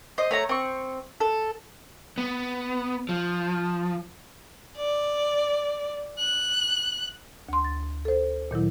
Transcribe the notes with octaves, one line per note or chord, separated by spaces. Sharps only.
C5 D#5
A3 C#5 A#5
C4 C#6
A4
B3
F3
D5
F#6
D2 C6
A6
A4 C5
A#2 D#3 F#3 E4